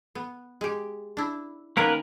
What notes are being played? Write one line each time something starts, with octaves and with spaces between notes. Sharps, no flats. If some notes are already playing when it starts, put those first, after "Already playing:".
B3
G#3 G4
D4 E4
D#3 A#3 B3 C#4 A#4 B4